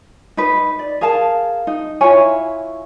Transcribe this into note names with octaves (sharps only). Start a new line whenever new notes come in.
D#4 B4
D5
G#4 A#4 F5 A5
D#4
E4 F4 C#5 G#5